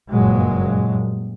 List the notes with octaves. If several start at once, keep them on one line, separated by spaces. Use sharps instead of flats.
F#1 G2 A#2 F#3 G#3